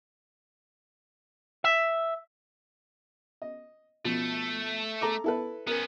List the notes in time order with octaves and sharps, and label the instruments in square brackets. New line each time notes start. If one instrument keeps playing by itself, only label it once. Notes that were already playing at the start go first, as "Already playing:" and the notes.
[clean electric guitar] E5
[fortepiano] D#5
[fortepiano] B2 F3 [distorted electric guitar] A3
[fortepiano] A4 A#5 D6
E4 A4 B4
[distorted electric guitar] B3 C#4 [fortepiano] A#4